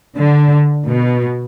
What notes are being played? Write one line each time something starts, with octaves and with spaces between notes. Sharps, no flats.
D3
B2